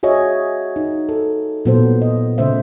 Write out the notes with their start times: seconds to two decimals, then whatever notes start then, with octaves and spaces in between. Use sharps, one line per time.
0.03 F#4 G#4 C#5 D#5 E5
0.76 D#4
1.09 A4
1.65 A#2 F#3 B3 A4 C5
2.02 D#5
2.38 C#3 A3 C5 E5